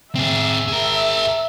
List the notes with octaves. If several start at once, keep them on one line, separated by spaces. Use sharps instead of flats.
C4 G#4 E5
G#4 A#4